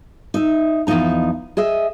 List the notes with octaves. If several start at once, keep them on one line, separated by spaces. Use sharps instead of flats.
D#4 E5
E2 G#2 F3 D#4 A#5
G#4 D#5 E5